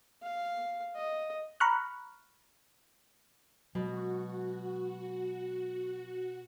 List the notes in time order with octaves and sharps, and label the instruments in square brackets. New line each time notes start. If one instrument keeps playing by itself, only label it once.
[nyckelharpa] F5
D#5
[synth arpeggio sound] A#5 B5 C#6 F6 F#6
[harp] B2 [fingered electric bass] F#3 G#3 [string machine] F#4